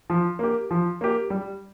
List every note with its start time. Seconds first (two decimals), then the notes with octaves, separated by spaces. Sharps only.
0.10 F3
0.39 A#3 G4
0.71 F3
1.01 A#3 G4
1.30 G3